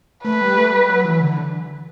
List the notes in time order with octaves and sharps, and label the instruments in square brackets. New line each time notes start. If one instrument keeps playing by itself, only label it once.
[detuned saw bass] A3 [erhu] B4
[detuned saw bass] G3
A3
G3
F#3
E3
D3